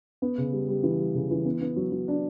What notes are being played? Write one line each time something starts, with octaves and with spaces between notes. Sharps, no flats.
B3
C#3
G3
G3
E3
G3
C#3
E3
B3
B3
F#3
F#3
D4